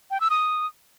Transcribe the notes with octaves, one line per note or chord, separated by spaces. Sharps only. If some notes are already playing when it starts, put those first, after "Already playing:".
G5
E6
D#6